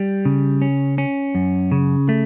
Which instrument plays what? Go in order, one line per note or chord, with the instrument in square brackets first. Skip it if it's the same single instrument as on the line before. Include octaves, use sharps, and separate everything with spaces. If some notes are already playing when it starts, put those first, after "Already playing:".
Already playing: [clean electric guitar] G3
C#3
C#4
C#4
F#2
C#3
A3